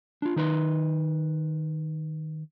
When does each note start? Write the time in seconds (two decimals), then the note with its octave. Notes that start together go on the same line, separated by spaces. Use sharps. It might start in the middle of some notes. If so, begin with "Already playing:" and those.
0.22 D4 F4
0.36 D#3 D#4 B4 C6